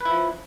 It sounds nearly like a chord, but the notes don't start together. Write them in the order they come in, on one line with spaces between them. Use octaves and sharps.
B4 E4 F3